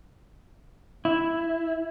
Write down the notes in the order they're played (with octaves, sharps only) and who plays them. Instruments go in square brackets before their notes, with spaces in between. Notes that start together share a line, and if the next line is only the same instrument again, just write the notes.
[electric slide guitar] E4